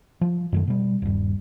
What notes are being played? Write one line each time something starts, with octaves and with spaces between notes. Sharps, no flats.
F3
F#2 D#3 A3
B2 G3
D#1 G2